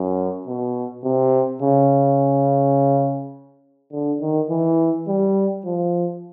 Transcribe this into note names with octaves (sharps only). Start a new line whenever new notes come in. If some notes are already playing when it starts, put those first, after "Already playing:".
Already playing: F#2
B2
C3
C#3
D3
D#3
E3
G3
F3